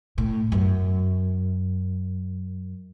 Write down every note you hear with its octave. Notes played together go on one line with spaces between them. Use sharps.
A2
F#2